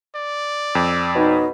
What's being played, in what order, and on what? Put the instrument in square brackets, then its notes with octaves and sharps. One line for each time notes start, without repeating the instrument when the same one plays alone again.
[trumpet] D5
[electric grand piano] F2 [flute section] E6
[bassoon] B2 [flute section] D#4 C#5